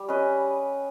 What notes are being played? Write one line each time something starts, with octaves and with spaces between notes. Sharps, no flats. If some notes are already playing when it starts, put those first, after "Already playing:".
Already playing: G3 G4
C#4 B4 D#5